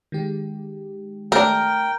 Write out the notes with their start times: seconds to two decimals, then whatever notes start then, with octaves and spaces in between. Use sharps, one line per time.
0.12 D#3 G#3 G4
1.32 A3 D4 A#4 G5